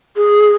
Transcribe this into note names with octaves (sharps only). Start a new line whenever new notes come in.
G#4